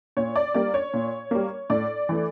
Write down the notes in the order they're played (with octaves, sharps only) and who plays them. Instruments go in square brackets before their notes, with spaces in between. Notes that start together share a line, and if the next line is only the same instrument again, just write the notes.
[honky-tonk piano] A#2 C#5
D5
G3 A#3 D5
C#5
A#2
G3 A#3
A2 D5
E3 A3